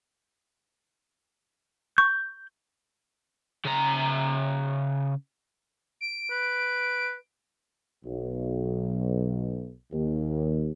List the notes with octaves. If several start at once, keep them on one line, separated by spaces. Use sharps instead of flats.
C#6 G6
C#3 A#5
D7
B4
B1
D#2